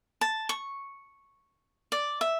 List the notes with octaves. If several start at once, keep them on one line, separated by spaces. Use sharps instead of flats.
A5
C#6
D5
E5